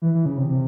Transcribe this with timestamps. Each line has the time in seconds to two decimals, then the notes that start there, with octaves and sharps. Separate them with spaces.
0.02 E3
0.14 E3
0.26 C#3
0.37 C3
0.49 C3